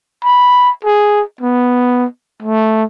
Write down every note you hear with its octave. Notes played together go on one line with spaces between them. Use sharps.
B5
G#4
B3
A3